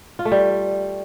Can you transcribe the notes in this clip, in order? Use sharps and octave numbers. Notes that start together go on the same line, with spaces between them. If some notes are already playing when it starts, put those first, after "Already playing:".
F4
A3
G3